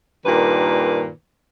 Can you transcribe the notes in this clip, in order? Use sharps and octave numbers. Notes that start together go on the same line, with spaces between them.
G2 A#2 D#3 B4